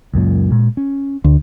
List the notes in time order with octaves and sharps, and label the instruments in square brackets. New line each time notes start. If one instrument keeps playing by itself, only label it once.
[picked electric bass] C#2 F#2 A#2
A#2 G#3
C#4
[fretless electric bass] D2